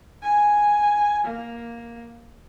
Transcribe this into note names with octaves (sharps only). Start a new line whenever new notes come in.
G#5
A#3